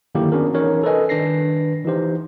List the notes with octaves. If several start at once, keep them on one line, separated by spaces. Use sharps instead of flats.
D3 D#3 F#3 A#3 E4 G4
B3 C#4 D4 F#4 G#4 A#4
E3 C#4 D#4 A#4 C#5
A4 B4 D#5 G#5
D#3 D4 B4 A#6 C7
E3 D#4 G4 C5